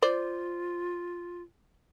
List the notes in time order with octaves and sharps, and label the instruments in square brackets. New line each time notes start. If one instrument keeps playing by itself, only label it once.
[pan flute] F4 [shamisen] C5 D5